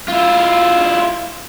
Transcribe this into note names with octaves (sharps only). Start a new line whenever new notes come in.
E4 F4